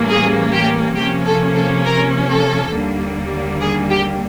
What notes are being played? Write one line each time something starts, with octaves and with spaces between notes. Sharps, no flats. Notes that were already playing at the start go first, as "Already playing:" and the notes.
Already playing: A2 E3 G3 A#3 C#4
G#4
G4
C3 F3 A#3 C#4 G4
A4
A4
A#4
A4
D#2 D3 G3 A#3
G#4
G4